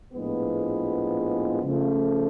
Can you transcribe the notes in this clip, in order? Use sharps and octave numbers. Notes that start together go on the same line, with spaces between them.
A#1 A2 F3 G#3 B3
C#3 F3 A3